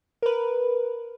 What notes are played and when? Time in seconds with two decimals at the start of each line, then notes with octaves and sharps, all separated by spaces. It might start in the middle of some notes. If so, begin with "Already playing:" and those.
0.22 A#4 B4